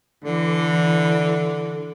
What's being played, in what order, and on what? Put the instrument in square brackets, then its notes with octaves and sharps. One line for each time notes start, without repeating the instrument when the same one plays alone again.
[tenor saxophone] D3 [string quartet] E3